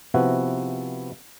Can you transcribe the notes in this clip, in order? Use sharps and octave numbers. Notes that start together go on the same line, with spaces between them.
C3 F3 B3 E4 F#4 B4